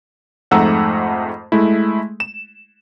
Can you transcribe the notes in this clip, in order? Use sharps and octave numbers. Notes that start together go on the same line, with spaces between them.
F2 G#2 A3 F#5 A#5 E6
G#3 A3 E4
E7